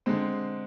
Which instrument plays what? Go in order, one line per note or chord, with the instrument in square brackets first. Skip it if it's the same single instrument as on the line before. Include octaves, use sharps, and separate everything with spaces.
[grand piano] D3 G#3 C4